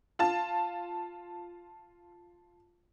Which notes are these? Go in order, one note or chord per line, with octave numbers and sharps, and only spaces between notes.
F4 A5